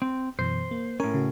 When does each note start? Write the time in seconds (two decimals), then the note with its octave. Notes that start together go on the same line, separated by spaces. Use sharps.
0.02 C4
0.39 F#2 B2 E3 C5
0.71 A#3
1.00 A2 C#4 A#4
1.14 C#3 F#4